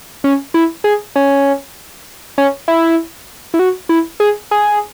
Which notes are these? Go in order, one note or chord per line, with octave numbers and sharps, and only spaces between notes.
C#4
E4
G#4
C#4
C#4
E4
E4
F#4
E4
G#4
G#4